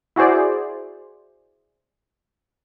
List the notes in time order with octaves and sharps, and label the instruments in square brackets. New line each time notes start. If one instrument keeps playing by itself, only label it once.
[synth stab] E4 F#4 G#4 C5 D5